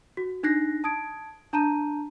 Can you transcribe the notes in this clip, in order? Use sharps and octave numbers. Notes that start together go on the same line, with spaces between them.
F#4
D4 D#4 F#6 A#6 C7
A5 D#6 G#6 D7
D4 A5 A#5 G6 D#7